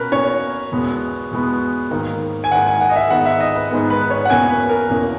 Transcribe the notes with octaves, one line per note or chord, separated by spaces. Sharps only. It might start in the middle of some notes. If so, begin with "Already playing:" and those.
Already playing: B2 A#3 C#4 A#4 B4
B2 A#3 C#4 C#5
E2 B2 G#3 B3
E2 B2 G#3 B3
G#2 D#3 A#3
G#5
G#2 D#3 A#3 F#5
G#5
F#5
D#5
E5
G#2 D#3 G#3 B3 F#5
E5
D#5
B4
G#2 D#3 G#3 B3
B4
C#5
F#5
E2 B2 A#3 C#4 G#5
B4
A#4
E2 B2 A#3 C#4